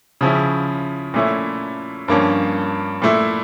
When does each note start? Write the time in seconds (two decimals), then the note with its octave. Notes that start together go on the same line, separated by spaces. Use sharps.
0.21 C#3 F3 C#4 E4
1.14 A#2 A3 C#4 E4
2.08 G2 F3 A#3 C#4
3.02 A#2 A3 E4